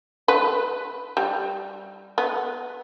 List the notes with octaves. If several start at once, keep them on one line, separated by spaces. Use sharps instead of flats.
B4
G3
B3